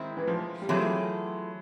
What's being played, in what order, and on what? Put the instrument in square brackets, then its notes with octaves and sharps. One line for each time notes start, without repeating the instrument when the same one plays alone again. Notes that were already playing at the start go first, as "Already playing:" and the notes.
Already playing: [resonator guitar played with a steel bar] D#3 G#3 C4 E4
[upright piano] E3
F3
G3
[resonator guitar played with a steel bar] E3 A3 C4 F4 G#4 [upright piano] F#3